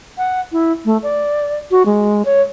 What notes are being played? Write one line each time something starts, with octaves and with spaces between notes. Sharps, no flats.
F#5
E4
A3
D5
F#4
G#3
C#5